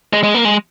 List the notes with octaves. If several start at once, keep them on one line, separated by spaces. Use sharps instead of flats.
G#3
G#3
A#3
G#3